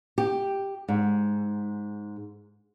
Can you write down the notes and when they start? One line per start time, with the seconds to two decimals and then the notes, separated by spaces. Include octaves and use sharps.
0.18 G4
0.89 G#2